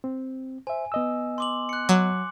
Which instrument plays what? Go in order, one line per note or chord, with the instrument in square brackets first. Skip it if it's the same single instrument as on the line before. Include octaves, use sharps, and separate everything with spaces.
[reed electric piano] C4
[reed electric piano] C5 E5 [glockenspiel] G#5
[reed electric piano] B3 D#5 E6
[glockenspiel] C6 D6 F#7
F#6 C#7
[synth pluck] F#3 [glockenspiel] D6